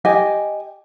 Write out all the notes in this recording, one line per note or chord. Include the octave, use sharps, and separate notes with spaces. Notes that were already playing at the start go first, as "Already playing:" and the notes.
G4 D#5 G#5